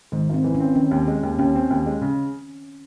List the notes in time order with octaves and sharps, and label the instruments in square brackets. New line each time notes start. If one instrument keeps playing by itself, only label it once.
[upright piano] G#2 [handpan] D#3
[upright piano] G#1
[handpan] C4
[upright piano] E3
[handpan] C#4
[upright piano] C4
[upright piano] D#3 [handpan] C#4
[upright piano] D#2
G#3
D#2
[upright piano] D#2 [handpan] C#4
[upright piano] C4
D#2
G#3
C#3